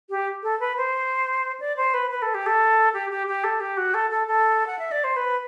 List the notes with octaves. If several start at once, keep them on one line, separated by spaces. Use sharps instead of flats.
G4
A4
B4
C5
D5
C5
B4
B4
A4
G4
A4
G4
G4
G4
A4
G4
F#4
A4
A4
A4
F#5
E5
D5
C5
B4